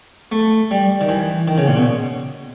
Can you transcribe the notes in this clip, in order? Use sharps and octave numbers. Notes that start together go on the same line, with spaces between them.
A3
G3
D#3
E3
D#3
C#3
A#2
B2